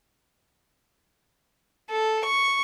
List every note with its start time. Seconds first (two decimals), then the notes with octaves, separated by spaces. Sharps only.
1.90 A4
2.26 C#6